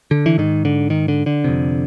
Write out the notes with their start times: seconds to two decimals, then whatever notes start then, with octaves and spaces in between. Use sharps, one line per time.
0.11 D3
0.26 E3
0.38 G#2 D#3
0.65 D3
0.90 D#3
1.08 D3
1.26 D3
1.44 F2 C3